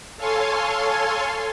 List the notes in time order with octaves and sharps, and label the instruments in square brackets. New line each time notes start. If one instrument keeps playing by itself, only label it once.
[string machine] A4 C#5 F5 G#5 A5 C6